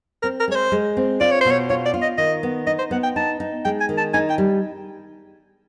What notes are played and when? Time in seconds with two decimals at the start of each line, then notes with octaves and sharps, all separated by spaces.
0.22 C4 A#4
0.40 A#4
0.48 G#3 C#5
0.55 C5
0.72 G#3
0.97 C4
1.20 F4 D5
1.31 C#5
1.41 B2 C5
1.51 C#5
1.70 F4 C#5
1.85 D5
1.94 F4
2.02 D#5
2.18 D#3 D#5
2.43 B3
2.67 D#4 D#5
2.79 C5
2.91 B3 F#5
3.03 G5
3.16 D#4 A5
3.40 D#4
3.65 G#3 G5
3.80 G#5
3.89 D#3
3.98 A5
4.13 D#4 G#5
4.30 G5
4.38 G3